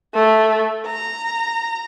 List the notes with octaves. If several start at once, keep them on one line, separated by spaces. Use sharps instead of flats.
A3
A#5